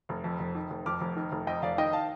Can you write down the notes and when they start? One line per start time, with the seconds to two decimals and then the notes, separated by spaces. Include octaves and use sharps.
0.09 F1
0.24 F2
0.39 F1
0.55 D#3
0.70 F1
0.86 F2 D6 F6
1.01 F1
1.16 D#3
1.32 F1
1.47 F2 D#5 G5
1.62 F1 D5 F5
1.78 D#3 D#5 G5
1.93 F5 A5